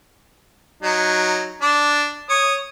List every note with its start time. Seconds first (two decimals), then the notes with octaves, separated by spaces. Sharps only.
0.83 F#3 D#4
1.61 D4 D5
2.29 C#5 D#6